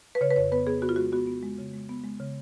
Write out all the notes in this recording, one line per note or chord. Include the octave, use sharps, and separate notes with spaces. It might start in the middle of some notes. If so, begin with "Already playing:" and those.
B4
C#3 C#5
B4
F2 C#5
B3 B4
B3 G#4
B3 F#4
F4
G#3 F#4
B3 F#4
B3
G#3
C#3
G#3
B3
G#3
C#3